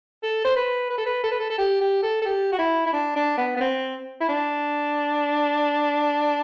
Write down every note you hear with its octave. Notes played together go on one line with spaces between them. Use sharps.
A4
C5
B4
B4
A4
B4
A4
B4
A4
A4
G4
G4
A4
A4
G4
F#4
E4
E4
D4
D4
B3
B3
C4
E4
D4